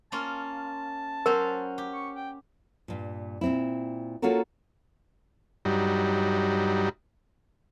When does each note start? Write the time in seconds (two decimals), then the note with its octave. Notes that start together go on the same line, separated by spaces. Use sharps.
0.12 A#3 C#4 F4 A5
1.26 F#3 C#4 A#4 C5
1.78 G4
1.94 C#6
2.15 G5
2.88 G2 A#2
3.41 A#2 C4 E4
4.22 A#3 C#4 F4 F#4 A4 A#4
5.65 G2 F#3 G3 D#4